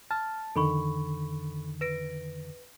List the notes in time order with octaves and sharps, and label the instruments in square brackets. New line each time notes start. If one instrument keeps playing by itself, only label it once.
[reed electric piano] A5 [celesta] F6
[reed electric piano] F2 D3 D#3 [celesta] A4 B5 C#6
[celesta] B4 A#6 D7